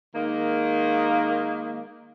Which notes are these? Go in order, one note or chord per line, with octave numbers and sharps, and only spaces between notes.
D#3 G#3 A#3